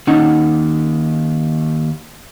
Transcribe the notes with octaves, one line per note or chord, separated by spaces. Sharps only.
D#2 C#4 D#4 F#5